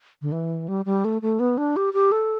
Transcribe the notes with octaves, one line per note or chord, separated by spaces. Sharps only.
D3
E3
G3
G3
A3
A3
B3
D4
G4
G4
A4